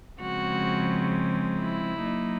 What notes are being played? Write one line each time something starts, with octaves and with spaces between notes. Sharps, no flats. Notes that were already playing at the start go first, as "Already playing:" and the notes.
C#3 F3 G#3 C4 F#4
E4
F#3 A#3 D#4